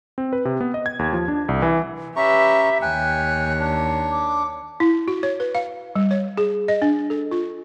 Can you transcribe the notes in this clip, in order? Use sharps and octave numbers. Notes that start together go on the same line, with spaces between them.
C4
B4
C3
B3
D#5
G#6
D#2
F3
D4
C2
E3
C#4 G4 B4 E5 A#5 C#6
D#2 C#5 G5 G#5 F#6
D4
D6
E4
F#4
C#5
B4
F5
G3
C#5
G#4
D#5
D4
A4
F4